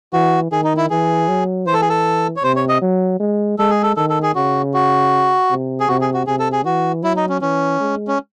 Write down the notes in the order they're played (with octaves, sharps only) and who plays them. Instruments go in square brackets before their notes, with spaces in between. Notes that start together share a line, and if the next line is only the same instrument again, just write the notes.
[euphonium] E3 [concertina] F#4
[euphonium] D#3 [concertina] G#4
[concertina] D#4
E4
[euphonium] E3 [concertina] G#4
[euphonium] F#3
[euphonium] E3 [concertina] C5
[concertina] A4
G#4
A4
C#5
[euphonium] C3 [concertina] C5
[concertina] C#5
D#5
[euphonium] F#3
G#3
[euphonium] G#3 [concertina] A4
[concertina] G#4
A4
[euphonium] D#3 [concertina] A4
[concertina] A4
G#4
[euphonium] C#3 [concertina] F#4
[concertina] F#4
[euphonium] C3
[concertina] G#4
[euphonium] C3 [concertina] F#4
[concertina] G#4
F#4
[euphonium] C3 [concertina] G#4
[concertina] A4
G#4
[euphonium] E3 [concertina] F#4
[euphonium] F#3 [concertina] E4
[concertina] D#4
C#4
[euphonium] E3 [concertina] C#4
[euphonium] G#3
[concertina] C#4